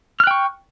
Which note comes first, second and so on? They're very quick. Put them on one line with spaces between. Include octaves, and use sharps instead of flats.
F6 F#6 G5 C#6